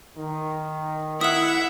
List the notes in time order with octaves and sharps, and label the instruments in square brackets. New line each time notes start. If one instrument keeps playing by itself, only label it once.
[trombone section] D#3
[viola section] E4 F#5 [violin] E5 [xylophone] D#6 E6